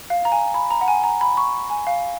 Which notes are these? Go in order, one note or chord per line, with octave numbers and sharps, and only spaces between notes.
F5
A#5
G#5
B5
A#5
F#5
G#5
A#5
B5
C#6
G#5
F5